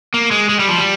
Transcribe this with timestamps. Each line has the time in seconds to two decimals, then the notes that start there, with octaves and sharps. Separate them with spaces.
0.14 A#3
0.31 G#3
0.49 G#3
0.59 G3
0.69 F3
0.78 G3